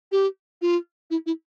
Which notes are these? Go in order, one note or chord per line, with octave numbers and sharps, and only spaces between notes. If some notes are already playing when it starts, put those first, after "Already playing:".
G4
F4
E4
E4